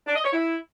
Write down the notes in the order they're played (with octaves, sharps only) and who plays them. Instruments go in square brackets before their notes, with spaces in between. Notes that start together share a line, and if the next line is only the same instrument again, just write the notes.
[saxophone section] D4
D#5
C#5
E4